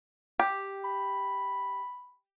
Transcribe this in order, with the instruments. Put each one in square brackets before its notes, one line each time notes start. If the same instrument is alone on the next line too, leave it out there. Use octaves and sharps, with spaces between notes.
[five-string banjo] G4
[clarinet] B5